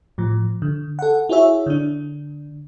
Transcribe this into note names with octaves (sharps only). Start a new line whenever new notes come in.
A2 F3
D3
A4 F#5
E4 F#4 G#4 C#5 E5
D3 D4